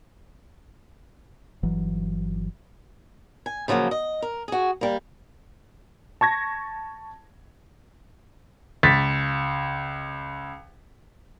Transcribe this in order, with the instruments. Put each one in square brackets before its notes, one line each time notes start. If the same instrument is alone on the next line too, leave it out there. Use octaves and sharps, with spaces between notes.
[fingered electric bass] G1 E3 F#3
[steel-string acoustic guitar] G#5
C#3 F3 F#3 A3 A#3
D#5
A#4
F#4 G#4
G3 A#3
[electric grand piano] A5 C#6 G#6 A#6
[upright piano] C#2 A6 B6